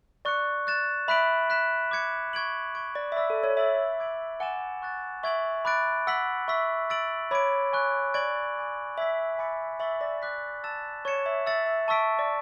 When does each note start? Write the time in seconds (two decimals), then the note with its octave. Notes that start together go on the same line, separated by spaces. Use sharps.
0.25 D5 C#6 F#6 C#7
0.67 F#6 A6 E7
1.08 E5 B5 F#6 B6 D7 F#7
1.50 F#6 B6 E7
1.91 D6 G#6 C#7
2.33 C#6 G#6 D7 F#7
2.75 C#6 G#6 D7
2.95 D5
3.12 E5
3.16 D5 B5 E6 B6
3.30 A4
3.43 C#5
3.57 E5 E6 A6 D7 F#7
3.99 D6 G#6 D7 F#7
4.40 F#5 G#5 D6 A6 E7
4.82 C#6 F#6 A6
5.23 E5 C#6 G#6 D7 F#7
5.65 B5 D6 F#6 A6 D7
6.07 F#5 E6 B6 F#7
6.48 E5 C#6 E6 B6
6.90 E6 A6 D7 F#7
7.31 C#5 B5 D6 G#6 D7
7.73 G#5 C#6 F#6
8.14 D5 C#6 G#6 D7 F#7
8.56 G#5 D6 G#6
8.97 E5 E6 G#6 B6
9.38 G#5 B5 D6 A6 C#7
9.80 E5 C#6 E6 A6 C#7 F#7
10.01 D5
10.22 D6 F#6 B6
10.64 A5 E6 A6 E7
11.05 C#5 C#6 G#6 C#7 E7
11.26 E5
11.46 E5 E6 A6 C#7
11.66 E5
11.88 A5 C#6 E6 B6 D7
12.19 D5